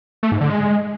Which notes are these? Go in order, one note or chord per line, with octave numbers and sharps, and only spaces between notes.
A3
G#2
D3
G#3